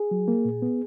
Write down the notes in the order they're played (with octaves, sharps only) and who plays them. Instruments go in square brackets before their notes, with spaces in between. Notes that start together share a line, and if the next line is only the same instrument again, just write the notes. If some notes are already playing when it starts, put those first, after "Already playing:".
Already playing: [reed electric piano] G#4
F#3
A#3
A#2
B3